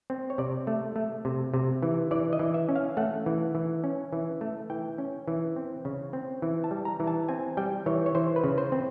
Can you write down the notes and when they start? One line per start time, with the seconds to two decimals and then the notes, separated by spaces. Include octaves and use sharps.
0.10 C4
0.30 C#5
0.38 C3 D5
0.67 A3
0.96 A3
1.25 C3
1.54 C3
1.83 E3
2.11 E3 D5
2.33 D#5
2.39 E3
2.54 E5
2.69 C#4
2.76 F5
2.97 A3 F#5
3.26 E3
3.55 E3
3.84 C#4
4.13 E3
4.41 A3
4.70 E3 G5
4.98 C#4
5.28 E3
5.56 C4
5.85 C#3
6.13 C4
6.42 E3
6.64 A5
6.71 G3
6.85 A#5
7.00 E3
7.07 A5
7.29 C4 G#5
7.57 G3 G5
7.86 E3 C#5
8.06 C#5
8.15 E3 C5
8.36 B4
8.44 C#3
8.58 C5
8.72 C4